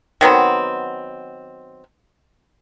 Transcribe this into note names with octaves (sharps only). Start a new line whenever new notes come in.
D#3 F#3 B3 C4